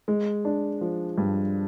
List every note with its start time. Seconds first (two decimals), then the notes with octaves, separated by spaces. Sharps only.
0.08 G#3
0.45 D4
0.81 F3
1.18 G2